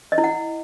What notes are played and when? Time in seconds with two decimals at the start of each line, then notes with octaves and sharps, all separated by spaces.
0.12 D#5
0.18 E4
0.24 F#5